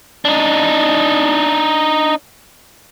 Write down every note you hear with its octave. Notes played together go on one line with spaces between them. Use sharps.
D4 D#4